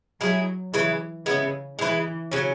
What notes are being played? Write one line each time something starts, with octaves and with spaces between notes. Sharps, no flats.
F#3 G#3 E4 G#4
C#3 E3 G#3 E4 B4
C#3 G#3 B3 E4
E3 G#3 E4 B4
C#3 F#3 C#4